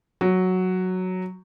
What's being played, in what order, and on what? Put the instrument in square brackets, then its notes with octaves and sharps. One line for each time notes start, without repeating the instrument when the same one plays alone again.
[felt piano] F#3